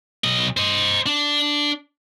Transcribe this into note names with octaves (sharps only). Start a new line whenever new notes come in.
B1 D#5
C5 D#5
D4